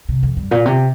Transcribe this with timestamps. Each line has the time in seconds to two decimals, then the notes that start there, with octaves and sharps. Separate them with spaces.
0.09 C3
0.23 F2
0.37 G2
0.51 A#2
0.66 C3